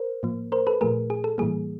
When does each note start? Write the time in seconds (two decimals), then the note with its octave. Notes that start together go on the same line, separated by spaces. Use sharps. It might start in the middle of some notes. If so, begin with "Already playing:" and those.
Already playing: A#4 C5
0.23 A2 F3 A#3
0.52 A#4 C5
0.67 A4 B4
0.81 A#2 F3 A3 G#4 A#4
1.10 G#4
1.24 A4
1.38 A2 E3 G3 A#3 G#4